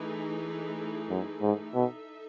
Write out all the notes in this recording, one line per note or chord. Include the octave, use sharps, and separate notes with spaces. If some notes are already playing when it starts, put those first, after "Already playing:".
Already playing: E3 A3 D#4 G#4
F#2
G#2
B2 D#4 A4 E5